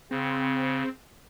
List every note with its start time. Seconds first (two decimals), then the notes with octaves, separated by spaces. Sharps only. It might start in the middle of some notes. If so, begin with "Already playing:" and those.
0.11 C#3 C4